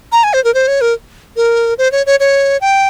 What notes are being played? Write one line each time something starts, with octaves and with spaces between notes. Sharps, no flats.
A#5
G#5
C5
A#4
C5
C#5
A#4
A#4
C5
C#5
C#5
C#5
G5